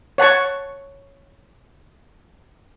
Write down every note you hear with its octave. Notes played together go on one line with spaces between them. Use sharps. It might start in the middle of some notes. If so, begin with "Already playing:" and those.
C#5 F#5 A5 C#6